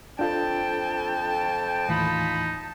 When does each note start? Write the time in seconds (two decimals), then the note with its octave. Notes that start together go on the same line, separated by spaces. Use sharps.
0.19 F2 D4 F4 A4 G5 A5
1.89 D#2 A2 E3 D#4 F4 B5